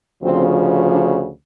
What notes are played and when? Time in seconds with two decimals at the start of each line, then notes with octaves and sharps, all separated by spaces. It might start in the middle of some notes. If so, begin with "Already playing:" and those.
0.22 D2 C#3 F3 C4
0.89 D4